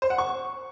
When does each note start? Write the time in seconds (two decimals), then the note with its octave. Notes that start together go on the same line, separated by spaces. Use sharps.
0.02 C5
0.10 F#5
0.18 C#6